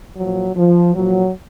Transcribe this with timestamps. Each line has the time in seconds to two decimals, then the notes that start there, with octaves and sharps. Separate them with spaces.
0.17 A#2 F3 F#3
0.57 F3
0.95 A#2 F3 F#3